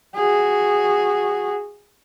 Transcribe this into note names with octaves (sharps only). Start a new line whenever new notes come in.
F#4 G#4